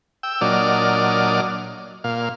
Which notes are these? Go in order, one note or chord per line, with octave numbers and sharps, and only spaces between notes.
G5 E6
A#2 F#3 D4 D5 D#5 F6
A#2 F5